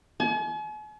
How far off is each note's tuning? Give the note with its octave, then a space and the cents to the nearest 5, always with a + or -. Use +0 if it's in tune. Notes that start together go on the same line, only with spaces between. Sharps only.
G#5 +45